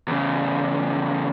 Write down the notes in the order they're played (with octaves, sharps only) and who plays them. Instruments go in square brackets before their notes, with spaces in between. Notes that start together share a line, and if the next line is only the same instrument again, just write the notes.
[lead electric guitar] E2 C#3